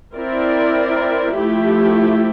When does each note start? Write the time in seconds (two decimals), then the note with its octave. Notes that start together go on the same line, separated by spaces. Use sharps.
0.15 C4 E4 A#4 D5
1.34 F3 A3 E4 G4